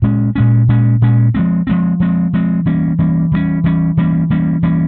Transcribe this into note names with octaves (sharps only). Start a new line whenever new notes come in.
A#2 G#3 C#4
A#2 G#3 C#4
A#2 G#3 C#4
A#2 G#3 C#4
F3 G#3 C4
F3 G#3 C4
F3 G#3 C4
F3 G#3 C4
E3 G3 A#3 C#4
E3 G3 A#3 C#4
E3 G3 A#3 C#4
E3 G3 A#3 C#4
E3 G3 A#3 C#4
E3 G3 A#3 C#4
E3 G3 A#3 C#4